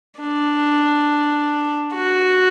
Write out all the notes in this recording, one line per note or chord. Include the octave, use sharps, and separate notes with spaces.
D4
F#4